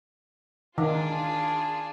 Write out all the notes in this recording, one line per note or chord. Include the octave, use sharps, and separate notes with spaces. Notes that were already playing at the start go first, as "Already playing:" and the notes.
D#3 D4 F4 G#4